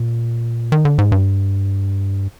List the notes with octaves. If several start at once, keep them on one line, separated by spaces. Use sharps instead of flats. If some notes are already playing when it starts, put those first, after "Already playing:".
Already playing: A#2
D#3
D3
G#2
G2